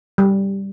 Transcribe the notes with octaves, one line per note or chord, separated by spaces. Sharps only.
G3